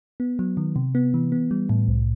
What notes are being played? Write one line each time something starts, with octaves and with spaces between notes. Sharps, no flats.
B3
F#3
D#3
C3
B3
E3
B3
G3
A2
C2